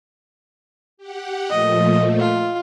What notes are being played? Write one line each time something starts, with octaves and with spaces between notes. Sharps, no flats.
G4 F#5
A#2 F3 A3 D#5
F4